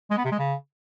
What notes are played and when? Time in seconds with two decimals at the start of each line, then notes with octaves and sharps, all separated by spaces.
0.10 G#3
0.17 B3
0.25 C3
0.32 G#3
0.39 C#3